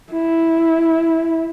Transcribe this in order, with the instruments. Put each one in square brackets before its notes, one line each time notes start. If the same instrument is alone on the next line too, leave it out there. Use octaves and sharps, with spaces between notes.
[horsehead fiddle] E4